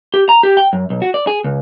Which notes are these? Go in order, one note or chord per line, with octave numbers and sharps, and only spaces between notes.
G4
A#5
G4
G5
F#2
B1
F#4
D5
G#4
C#2